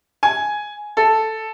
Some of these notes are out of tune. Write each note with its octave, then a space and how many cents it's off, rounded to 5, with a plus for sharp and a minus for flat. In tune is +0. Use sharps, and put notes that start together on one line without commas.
G#5 +5
A4 +0